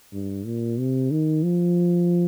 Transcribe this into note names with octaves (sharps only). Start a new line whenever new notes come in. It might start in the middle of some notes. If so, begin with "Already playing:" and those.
G2
A#2
C3
D#3
F3